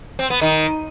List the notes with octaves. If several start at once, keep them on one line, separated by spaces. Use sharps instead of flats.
C4
B3
D#3